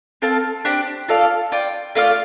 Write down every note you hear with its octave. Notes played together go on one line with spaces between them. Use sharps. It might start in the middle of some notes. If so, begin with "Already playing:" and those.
C4 A4 F5 A5
D4 G4 C5
F4 A4 D5 F5
F4 D5 G5
A3 F4 D5 F5